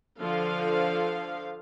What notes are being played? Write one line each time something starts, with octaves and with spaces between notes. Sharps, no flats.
D3 F3 F5